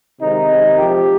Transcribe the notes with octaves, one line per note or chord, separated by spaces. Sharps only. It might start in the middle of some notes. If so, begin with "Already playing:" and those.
C3 D#3 G#3 D#4
C3 D#3 G#3
C3 F3 G#3 G4